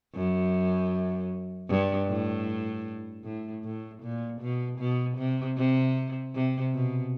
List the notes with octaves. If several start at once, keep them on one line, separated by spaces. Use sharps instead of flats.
F#2
G2
A2
A2
A2
A#2
B2
B2
C3
C3
C3
B2